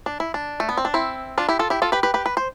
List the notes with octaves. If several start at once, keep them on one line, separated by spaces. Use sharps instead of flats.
D4
E4
D4
A3
B3
C4
D4
C4 E4
D4 F4
E4 G4
F4 A4
E4 G4
F4 A4
G4 B4
G4 B4
G4 B4
B4
C5